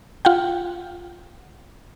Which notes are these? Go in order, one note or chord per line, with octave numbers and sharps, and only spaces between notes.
F4 F#5 G5